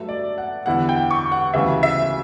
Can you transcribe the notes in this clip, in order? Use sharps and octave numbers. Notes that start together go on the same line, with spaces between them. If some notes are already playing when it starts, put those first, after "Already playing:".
Already playing: G2 F#3 A3 E5
D5
F#5
E2 D3 G3 B3 E4 F#5
G5
C#6
F#5
D2 C#3 E3 G3 E5
E5